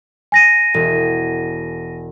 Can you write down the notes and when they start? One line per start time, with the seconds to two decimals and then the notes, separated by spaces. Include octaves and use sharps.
0.32 G#5 A#6 D#7
0.74 E1